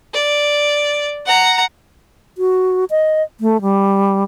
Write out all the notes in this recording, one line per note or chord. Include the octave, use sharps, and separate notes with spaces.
D5
F#5 A#5
F#4
D#5
A3
G3